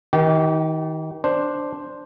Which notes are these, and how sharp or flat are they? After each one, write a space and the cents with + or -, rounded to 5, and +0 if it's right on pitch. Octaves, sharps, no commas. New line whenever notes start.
D#3 +30 G4 -35
D4 +0 C5 +0